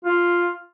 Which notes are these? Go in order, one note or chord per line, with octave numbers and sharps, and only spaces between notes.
F4